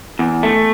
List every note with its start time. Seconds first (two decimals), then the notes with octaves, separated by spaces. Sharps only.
0.19 E2
0.43 A3